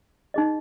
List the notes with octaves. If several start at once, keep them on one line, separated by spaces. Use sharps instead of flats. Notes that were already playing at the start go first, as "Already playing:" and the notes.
D#4 G#4 D#5